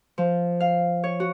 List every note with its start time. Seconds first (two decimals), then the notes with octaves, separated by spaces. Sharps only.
0.18 F3
0.60 F5
1.04 C#5
1.20 F#4